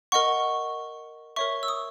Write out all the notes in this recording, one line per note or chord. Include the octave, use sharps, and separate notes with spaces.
A#4 D#5 F#5 C#6
A#4 C#5 E5 C#6
E6
D#6